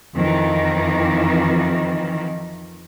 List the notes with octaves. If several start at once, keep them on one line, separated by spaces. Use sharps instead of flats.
F2 D#3 E3